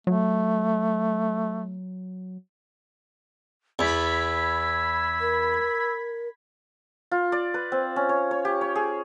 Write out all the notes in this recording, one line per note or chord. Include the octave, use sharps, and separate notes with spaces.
F#3 A3
E2 B5 E6 G#6 B6
A#4
F4
D5
B4
C4
C#4
C#5
C#5
G4
C#5
G#4